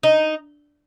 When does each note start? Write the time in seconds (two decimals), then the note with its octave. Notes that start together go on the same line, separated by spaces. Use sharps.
0.03 D#4